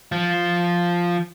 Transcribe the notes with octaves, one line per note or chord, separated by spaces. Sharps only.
F3 F4